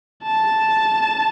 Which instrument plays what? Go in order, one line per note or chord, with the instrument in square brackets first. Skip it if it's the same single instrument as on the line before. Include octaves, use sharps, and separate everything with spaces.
[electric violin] A5